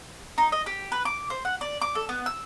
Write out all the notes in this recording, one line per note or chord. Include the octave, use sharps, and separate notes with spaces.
D#4
D#5
G4
B4
D6
C5
F#5
D5
D6
A4
B3
E6